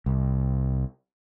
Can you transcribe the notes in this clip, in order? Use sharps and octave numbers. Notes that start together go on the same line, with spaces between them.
C2